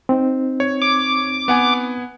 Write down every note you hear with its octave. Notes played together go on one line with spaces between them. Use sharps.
C4 D#4
C#5
D6
B3 F#5 G#5